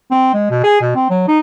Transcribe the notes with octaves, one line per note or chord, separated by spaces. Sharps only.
C4
G#3
B2
G#4
B2
C4
F#3
D#4